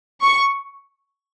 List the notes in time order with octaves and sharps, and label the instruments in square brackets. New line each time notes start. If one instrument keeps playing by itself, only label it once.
[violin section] C#6